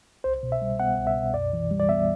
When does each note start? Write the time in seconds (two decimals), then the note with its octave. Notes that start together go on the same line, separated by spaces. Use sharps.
0.24 C2 C5
0.43 B2
0.52 E5
0.62 G3
0.80 B3 F#5
0.99 C2
1.07 E5
1.16 B2
1.34 F#2 D5
1.53 E3
1.71 G3
1.80 D5
1.89 B3 E5